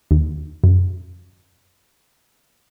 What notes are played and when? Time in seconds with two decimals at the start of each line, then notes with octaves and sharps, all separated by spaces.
0.11 D#2
0.64 F#2